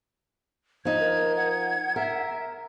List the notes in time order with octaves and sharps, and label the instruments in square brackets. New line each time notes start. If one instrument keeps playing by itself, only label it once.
[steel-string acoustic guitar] F3 D#4 [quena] G#6
[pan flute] A#4
F#5
[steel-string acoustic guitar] A#4 [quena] E5